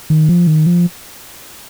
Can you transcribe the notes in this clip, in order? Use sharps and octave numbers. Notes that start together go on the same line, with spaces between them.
D#3
F3
D#3
F3